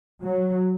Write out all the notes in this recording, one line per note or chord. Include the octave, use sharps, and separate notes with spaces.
F#3